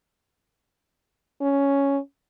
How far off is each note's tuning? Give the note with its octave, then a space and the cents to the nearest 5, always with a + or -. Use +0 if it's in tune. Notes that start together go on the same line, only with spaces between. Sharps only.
C#4 +5